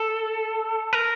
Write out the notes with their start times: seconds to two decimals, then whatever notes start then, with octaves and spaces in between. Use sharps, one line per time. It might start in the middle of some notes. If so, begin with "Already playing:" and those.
Already playing: A4
0.93 A#4